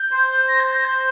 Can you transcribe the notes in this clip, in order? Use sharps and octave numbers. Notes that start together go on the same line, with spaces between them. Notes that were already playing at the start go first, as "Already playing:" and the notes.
Already playing: G6
C5
A#6
G6
A#6
G6